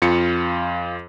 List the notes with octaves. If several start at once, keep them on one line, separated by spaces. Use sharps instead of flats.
F2 F4 F5 C#7